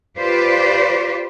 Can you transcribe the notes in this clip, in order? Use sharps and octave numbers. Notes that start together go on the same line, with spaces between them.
F4 G4 B4 C5 D5